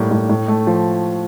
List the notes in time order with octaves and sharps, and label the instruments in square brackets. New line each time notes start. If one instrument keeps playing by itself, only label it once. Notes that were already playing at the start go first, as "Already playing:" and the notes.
Already playing: [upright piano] A2 G3 A#3
A2
A2
A3
F3